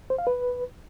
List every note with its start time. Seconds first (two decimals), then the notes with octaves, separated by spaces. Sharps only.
0.10 C5
0.18 F5
0.27 B4